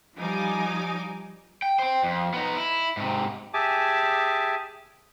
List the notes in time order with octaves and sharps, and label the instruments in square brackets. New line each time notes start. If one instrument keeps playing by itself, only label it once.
[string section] F3 G3 D#4 G#5 D6
[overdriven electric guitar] G5
C5 G5
F2
B3 D#4
E4
G#2 C3
[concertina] G4 G#4 E5 G#5 A5 D6